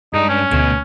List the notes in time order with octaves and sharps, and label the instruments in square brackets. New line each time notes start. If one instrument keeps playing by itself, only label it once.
[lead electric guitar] G2 D4 [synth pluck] G#3 [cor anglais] D#4
[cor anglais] C#4
[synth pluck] D2 A3 G#5 [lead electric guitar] B2